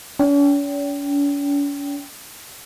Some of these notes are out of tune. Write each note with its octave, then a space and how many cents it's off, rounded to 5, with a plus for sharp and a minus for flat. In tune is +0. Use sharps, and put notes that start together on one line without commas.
C#4 +45 G5 +0